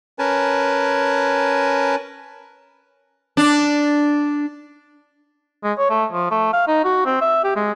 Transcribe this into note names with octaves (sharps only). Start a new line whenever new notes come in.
C#4 A#4 B4 G#5 A5
D4
G#3
C#5
A3
F3
A3
F5
D#4
F#4
C4
E5
G4
G#3